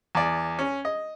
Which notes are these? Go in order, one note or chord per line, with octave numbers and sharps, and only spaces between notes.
E2 D5
C#4
D#5